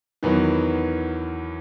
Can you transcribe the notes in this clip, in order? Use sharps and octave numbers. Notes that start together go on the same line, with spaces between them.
E2 D#3 F#3 B3